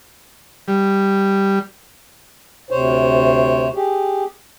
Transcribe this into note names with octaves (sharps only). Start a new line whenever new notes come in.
G3
D2 C3 C5 C#5
G4 G#4